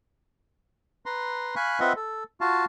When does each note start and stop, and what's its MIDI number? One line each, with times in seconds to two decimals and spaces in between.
1.06 1.55 71
1.06 1.55 82
1.06 1.55 84
1.56 1.80 77
1.56 1.80 80
1.56 1.80 83
1.56 1.80 85
1.56 1.80 90
1.80 1.93 60
1.80 1.93 65
1.80 1.93 71
1.80 1.93 75
1.80 1.93 76
1.80 1.93 78
1.96 2.24 69
2.41 2.65 65
2.41 2.65 66
2.41 2.65 77
2.41 2.65 81